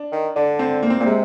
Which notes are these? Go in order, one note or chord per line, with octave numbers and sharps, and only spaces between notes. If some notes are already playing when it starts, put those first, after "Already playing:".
Already playing: D4
D#3
D3 D4
C4
A#3
C4
A#2 A#3
C3 G#3